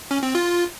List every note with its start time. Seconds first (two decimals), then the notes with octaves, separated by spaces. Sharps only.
0.11 C#4
0.23 C4
0.35 F4